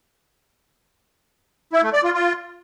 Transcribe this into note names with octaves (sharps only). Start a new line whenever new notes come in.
E4
A3
D5
F4
F4